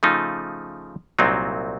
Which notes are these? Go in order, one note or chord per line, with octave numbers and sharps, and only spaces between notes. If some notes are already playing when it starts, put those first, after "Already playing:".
C#3 F3 A3 D#4
C2 A#2 F#3 C4 D#4